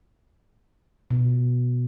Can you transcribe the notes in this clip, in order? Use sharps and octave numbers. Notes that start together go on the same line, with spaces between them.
B2